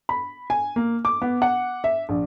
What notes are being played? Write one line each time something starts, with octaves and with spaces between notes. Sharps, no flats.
B5
G#5
A#3
D6
B3
F#5
E5
A#1